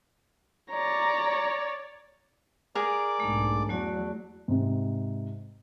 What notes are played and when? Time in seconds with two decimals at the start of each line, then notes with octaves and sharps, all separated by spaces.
0.71 C#5 D5 A#5
2.75 G#4 A#4 D5 D6
3.20 B1 G#2 A3 D4
3.69 E2 F#3 A3 F#4 D5
4.48 G#2 C3